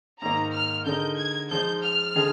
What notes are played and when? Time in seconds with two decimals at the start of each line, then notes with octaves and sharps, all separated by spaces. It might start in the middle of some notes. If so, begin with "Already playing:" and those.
0.22 G#2 D#3 A#3 D#4 A#5
0.53 F6
0.86 D3 G#3 D#4 A#4 G6
1.19 G#6
1.51 F3 G#3 D#4 G6
1.84 F6
2.16 D3 F3 G#3 D#4 G#4